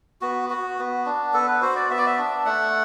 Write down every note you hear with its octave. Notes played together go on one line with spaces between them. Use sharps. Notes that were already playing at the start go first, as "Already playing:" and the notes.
B3 F#4
F#4
B3
D4
B3 A4
B4
F#4 C5
D5
B3 E5
D5
E5
D4
A3 F#5